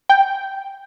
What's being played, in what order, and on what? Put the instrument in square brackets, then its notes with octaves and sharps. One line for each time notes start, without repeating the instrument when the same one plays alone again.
[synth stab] G5